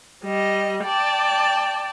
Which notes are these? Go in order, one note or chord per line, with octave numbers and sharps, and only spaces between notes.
G3 D#5
D5 G5 A5